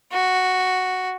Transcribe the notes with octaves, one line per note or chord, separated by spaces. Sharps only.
F#4